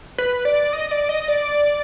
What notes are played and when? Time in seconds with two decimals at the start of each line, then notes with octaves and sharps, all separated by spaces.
0.18 B4
0.45 D5
0.73 D#5
0.91 D5
1.09 D#5
1.28 D5